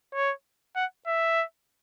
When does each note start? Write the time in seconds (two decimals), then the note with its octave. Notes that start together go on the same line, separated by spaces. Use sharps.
0.14 C#5
0.76 F#5
1.07 E5